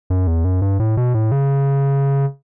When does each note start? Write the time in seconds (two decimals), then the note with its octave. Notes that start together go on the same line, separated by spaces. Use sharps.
0.10 F#2
0.27 E2
0.45 F#2
0.62 G2
0.80 A2
0.97 B2
1.14 A2
1.32 C#3